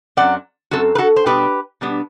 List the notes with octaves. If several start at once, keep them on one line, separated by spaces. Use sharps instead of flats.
F#2 F#3 C4 D5 F#5
F#2 F#3 C4 F#4 A4
B4
F#4 A4
C5
B2 G3 B3 D4 G4 B4
B2 G3 B3 D4